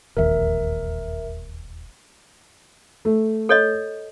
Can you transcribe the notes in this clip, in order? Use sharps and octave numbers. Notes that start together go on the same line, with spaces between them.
E1 A#1 D#2 A#4 E5
A3
A4 C#5 D#5